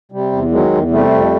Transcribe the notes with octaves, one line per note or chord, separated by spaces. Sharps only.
C3 G3
E2
D#3 F#3 G#3
E2
C3 G3 A3
F2